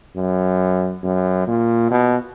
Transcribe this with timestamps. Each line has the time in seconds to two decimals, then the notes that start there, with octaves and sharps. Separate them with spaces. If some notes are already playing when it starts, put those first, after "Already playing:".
0.16 F#2
1.03 F#2
1.47 A#2
1.91 B2